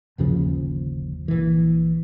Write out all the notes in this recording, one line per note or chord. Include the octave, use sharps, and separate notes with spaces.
G1 D#2 C#3 F3
A#1 E3